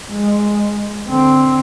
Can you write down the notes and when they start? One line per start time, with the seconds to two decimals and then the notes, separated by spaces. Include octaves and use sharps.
0.10 G#3
1.07 D3 C4